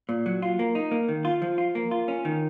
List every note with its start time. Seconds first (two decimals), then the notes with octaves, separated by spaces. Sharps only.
0.09 A#2
0.26 F#3
0.42 F4
0.59 A#3
0.75 D#4
0.91 A#3
1.08 D#3
1.25 F4
1.42 F3
1.58 F4
1.75 A#3
1.91 F4
2.08 C#4
2.25 D#3